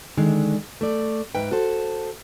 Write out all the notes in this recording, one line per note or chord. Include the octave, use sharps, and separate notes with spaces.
D3 D#3 G#3
A3 D5
G#2 B4 E5 G5
F#4 A4 C5